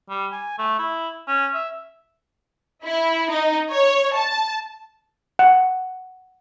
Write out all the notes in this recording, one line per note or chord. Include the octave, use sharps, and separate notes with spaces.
G3
G#5
A3
E4
C#4
E5
E4
D#4
C#5
A5
F#5